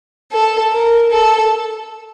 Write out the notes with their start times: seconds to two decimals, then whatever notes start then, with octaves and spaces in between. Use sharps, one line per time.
0.32 A4
0.72 A#4
1.11 A4